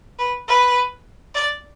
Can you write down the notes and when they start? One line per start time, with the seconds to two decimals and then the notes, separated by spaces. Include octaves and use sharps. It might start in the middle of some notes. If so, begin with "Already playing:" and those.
0.19 B4
0.48 B4
1.35 D5